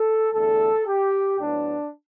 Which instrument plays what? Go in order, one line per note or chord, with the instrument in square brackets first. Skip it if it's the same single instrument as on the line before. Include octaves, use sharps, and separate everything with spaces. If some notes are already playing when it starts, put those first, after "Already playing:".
Already playing: [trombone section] A4
E2 D3 A3 A4
G4
A2 F#3 B3 D4